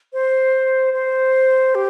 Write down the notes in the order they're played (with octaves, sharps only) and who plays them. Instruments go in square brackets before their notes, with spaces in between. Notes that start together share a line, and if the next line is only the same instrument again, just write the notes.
[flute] C5
C5
G4